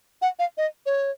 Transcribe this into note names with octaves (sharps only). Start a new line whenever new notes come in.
F#5
F5
D#5
C#5